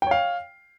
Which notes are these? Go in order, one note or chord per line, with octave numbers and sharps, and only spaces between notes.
C#5 F5 G5